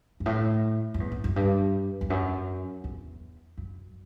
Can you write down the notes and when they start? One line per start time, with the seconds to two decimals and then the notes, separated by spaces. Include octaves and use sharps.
0.20 G2
0.26 A2
0.94 F#2
1.00 E2
1.12 E2
1.24 F#2
1.36 G2
2.01 E2
2.10 F#2
2.84 E2
3.58 F#2